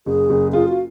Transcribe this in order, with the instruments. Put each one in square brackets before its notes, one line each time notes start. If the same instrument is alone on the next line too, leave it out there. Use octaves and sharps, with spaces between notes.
[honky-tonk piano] F#1 [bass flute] G#4
[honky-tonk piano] F#1
[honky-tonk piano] F4 [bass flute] G#4
[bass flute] F#4